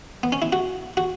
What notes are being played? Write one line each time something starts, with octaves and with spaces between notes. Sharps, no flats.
B3
C#4
E4
F#4
F#4